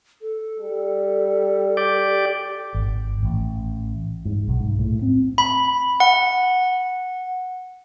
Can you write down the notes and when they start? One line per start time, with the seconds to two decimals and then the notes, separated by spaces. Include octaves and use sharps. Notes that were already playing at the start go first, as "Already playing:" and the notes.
0.21 A4
0.59 G3
1.77 G4 D5
2.74 G#1
3.23 A1
4.25 G#2
4.48 B1
4.60 G#2
4.79 A2
5.02 C4
5.38 B5
6.00 F#5